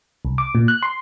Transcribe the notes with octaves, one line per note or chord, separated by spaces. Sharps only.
C2
D6
A#2
F#6
C6